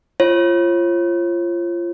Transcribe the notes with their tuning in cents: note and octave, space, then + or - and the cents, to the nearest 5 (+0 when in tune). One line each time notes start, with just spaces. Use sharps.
F4 -20 C#5 -45